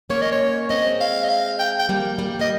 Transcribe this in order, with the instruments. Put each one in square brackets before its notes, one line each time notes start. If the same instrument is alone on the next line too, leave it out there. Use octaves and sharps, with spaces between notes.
[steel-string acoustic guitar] A#3 C#4 [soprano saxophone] C#5
[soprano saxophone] D#5
C#5
[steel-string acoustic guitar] G#3 C4 [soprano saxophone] D#5
[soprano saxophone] F5
D#5
F5
G5
G5
[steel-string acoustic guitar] G3 A#3
G3 A#3
[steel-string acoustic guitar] A#3 [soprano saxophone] D#5